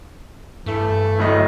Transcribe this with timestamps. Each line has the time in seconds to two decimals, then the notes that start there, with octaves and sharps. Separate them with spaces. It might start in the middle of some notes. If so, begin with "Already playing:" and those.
0.66 G2 E3 A3
1.19 D1 A2 D#5